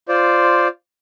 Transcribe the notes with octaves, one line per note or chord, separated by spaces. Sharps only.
F4 C5 D5